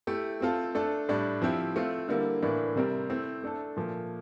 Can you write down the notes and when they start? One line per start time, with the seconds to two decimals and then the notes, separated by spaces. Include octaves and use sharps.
0.07 A3 E4 G4
0.40 A3 C4 F4 A4
0.75 A3 D4 A4
1.09 A2 G3 D4
1.42 F3 C4 E4 G4
1.76 A3 C4 F4
2.09 D3 G3 A#3 E4
2.42 A2 E3 A#3 D4
2.76 C3 G3 C4 G4 A#4
3.10 A3 C4 E4
3.43 A3 D4 A4
3.76 A#2 F3 A3